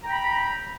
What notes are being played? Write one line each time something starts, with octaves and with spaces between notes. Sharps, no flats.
G5 A#5 B5